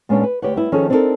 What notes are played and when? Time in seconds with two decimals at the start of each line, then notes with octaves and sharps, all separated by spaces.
0.09 A#2 G#3 B3 C#4 D4
0.23 B4
0.42 D2 G4 B4 C#5 F#5
0.56 G3 B3 E4
0.72 D#3 F3 C#4 G#4 A4
0.90 C4 D4 D#4 F#4 A4 A#4